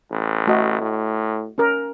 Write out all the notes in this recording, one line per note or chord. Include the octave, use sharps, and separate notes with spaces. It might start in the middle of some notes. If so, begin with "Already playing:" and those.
A1
A3 F#4 D#5
A2
C#4 A#4